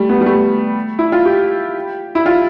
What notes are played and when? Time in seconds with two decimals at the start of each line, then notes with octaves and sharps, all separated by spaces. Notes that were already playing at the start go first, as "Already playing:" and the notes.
Already playing: G3 A3
0.09 B3
0.21 G3
0.26 A3
0.99 E4
1.12 F4
1.25 G4
2.15 E4
2.26 F4